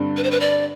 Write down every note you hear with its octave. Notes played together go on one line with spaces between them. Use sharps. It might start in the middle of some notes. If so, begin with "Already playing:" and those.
Already playing: G2 D3 G3 C4
B4
C5
B4
D5